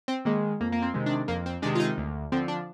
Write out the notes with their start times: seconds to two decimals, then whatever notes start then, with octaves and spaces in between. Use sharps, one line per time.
0.08 C4
0.25 D#3 G#3 A#3
0.61 F2 A#3
0.72 A#3
0.82 C4
0.94 C3 D#3 G#3
1.06 D4
1.28 F2 A#3
1.46 C4
1.62 C3 D#3 G#3 D4
1.75 F4
1.80 D#4
1.98 D2
2.32 D3 F3 C4
2.48 D4